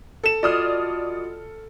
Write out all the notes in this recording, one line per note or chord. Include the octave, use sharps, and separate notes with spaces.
A4 E7
F4 F#4 D5 D#5 D#6 F6